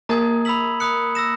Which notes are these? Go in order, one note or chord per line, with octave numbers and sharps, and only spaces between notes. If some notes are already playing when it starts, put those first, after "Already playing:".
A#3 A#4 A#5 D#6 G#6
B5 E6 B6 F#7
B5 D#6 F#6 C#7
E6 A#6 E7